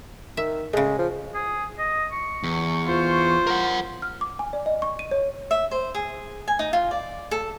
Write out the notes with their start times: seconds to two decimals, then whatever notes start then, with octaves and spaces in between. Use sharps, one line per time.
0.37 D#3 E5
0.73 A2 C#3 G#3
0.99 F3
1.34 G#4
1.79 D#5
2.12 C#6
2.43 E2
2.86 F4 C5
3.47 A#4 F#5
4.02 F6
4.21 D6
4.39 G#5
4.53 D5
4.66 D#5
4.82 C#6
4.99 D#7
5.11 C#5
5.51 E5
5.71 C5
5.95 G#4
6.48 G#5
6.59 D#4
6.73 F4
6.91 D5
7.31 A4